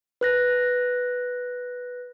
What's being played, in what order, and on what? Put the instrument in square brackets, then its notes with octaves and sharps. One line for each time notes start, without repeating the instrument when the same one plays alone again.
[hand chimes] B4 F#6 A#6